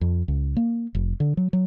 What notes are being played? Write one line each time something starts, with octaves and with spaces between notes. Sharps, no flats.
F2
C#2
A#3
F1
D3
F#3
F#3